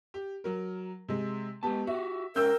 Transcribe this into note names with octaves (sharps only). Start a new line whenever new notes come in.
G4
F#3 A#4
C3 G#3
G#3 B3 G4 A5
F#4 G4 E5
G#2 C#4 A#4 G5 E6 G6